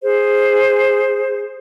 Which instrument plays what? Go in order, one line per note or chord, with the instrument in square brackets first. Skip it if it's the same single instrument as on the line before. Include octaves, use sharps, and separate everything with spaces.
[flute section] G#4 C5